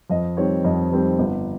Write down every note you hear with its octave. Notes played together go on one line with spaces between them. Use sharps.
F2 D#5
D#3 G3 C4 C#5
F2 D#5
D#3 G3 C4
G1